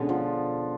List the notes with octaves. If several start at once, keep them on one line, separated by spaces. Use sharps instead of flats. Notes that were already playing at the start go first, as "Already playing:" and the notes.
Already playing: B2 D3 G#3 C#4
F3